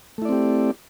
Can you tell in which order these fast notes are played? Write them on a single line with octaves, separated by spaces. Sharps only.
A3 E4 D5 C4 G4